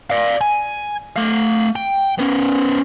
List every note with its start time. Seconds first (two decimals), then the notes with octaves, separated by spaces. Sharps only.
0.10 D5 F5
0.41 G#5
1.16 A3 F5
1.76 G5
2.19 B3 C#4